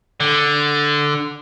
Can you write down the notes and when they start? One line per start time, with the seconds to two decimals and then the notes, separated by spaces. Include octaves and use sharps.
0.20 D3